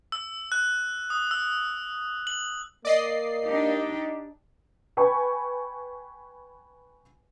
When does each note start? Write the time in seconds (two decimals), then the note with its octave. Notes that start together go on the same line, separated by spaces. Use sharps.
0.12 E6
0.52 F#6
1.10 D#6
1.31 E6
2.27 F#7
2.85 A#3 D5 D#5 C7
3.45 D4 D#4 G4
4.97 B4 G5 G#5 B5 C#6